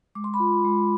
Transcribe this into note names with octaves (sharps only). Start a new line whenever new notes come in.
G#3 D6
C6
B5 D6
F4
G#3